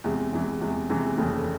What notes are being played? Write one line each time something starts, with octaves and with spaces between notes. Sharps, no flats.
E2 C3 E3 G#3
E2 C3 E3 G#3
E2 C3 E3 G#3
E2 C3 E3 G#3
F1 D#2 C#3 E3 A3